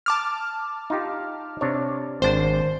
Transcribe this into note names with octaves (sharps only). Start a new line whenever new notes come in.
A5 D6 F6
D#4 F4 G4
C3 D4 C#5
G#1 D4 C5